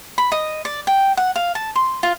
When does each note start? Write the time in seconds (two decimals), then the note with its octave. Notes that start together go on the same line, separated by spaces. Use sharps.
0.18 B5
0.32 D#5
0.65 D5
0.87 G5
1.17 F#5
1.36 F5
1.55 A5
1.76 C6
2.03 F4